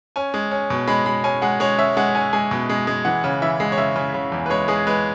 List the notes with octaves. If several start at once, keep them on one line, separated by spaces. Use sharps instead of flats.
C#4 G#5
G#3
C#4
B2
G#3 B5
G#3 B5
C#4 G#5
G#3 F#5
G#3 C#5
C#4 E5
G#3 F#5
C#4 G#5
G#3 G#5
B2
G#3
G#3
E3 F#5
C#3
E3 E5
G#3
C#5
C#3 E5
C#3
C#3
E2
B4
G#3 C#5
G#3 G#4
G#3 B4